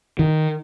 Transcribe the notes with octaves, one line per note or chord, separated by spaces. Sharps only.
D#3